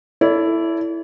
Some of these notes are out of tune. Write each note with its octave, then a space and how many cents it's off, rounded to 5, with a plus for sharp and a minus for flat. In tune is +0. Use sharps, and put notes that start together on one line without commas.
E4 +5 A4 +5 D5 -45